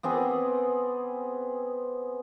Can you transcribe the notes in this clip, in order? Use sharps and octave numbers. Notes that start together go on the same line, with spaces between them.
B3 C4 G#4 D5